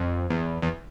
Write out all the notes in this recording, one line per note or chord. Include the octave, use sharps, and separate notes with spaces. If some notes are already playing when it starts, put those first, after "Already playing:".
Already playing: F2
E2
E2